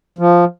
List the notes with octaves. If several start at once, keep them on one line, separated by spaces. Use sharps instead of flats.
F3